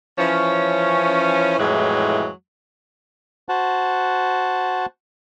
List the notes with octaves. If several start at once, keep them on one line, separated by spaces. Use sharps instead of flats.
E3 F3 C#4
F2 A2 E3 F#3 G#3
F#4 C5 F#5 A5